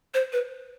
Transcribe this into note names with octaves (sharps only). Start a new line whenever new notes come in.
C5
B4